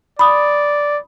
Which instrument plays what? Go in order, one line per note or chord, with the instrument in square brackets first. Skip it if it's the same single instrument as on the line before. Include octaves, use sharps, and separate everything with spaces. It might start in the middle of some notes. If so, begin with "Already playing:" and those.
[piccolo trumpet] D5 [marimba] B5 D#6